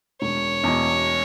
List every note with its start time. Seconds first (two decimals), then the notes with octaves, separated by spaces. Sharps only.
0.22 E1 C#5
0.64 E2 B2